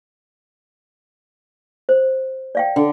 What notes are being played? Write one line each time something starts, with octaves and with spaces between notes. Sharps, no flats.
C5
D5 F5 G5
D3